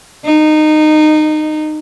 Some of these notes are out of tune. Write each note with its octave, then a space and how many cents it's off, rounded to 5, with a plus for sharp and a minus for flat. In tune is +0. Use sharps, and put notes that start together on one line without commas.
D#4 -20